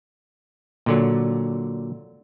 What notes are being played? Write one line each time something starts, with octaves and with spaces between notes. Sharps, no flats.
A#2 D3 F#3